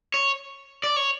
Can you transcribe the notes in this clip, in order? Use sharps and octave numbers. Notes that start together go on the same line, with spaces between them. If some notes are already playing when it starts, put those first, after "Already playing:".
C#5
D5
C#5